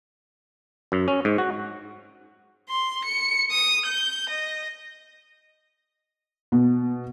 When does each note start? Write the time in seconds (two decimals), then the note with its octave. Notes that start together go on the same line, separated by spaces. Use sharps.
0.92 F#2
1.08 C#4
1.25 G#2
1.38 F#4
2.69 C6
3.05 C#7
3.51 D#6
3.86 G6
4.29 D#5
6.52 B2